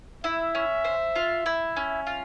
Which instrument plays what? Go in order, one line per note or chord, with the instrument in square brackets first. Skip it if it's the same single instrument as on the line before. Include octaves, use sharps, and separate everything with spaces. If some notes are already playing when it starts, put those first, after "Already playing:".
[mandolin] E4 [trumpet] E5
[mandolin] C#4
C5
F4
E4
C#4
F4